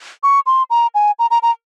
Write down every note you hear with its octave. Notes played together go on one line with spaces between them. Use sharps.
C#6
C6
A#5
G#5
A#5
A#5
A#5